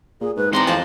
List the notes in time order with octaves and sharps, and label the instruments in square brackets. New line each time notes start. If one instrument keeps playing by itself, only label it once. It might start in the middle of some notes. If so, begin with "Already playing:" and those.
[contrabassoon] A#2 [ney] G#4
[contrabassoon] G#2 [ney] B4
[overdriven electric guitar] E3 C6 [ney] C4 [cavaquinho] D#4 D5 A#5
[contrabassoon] F2 [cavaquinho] F4 C5 A5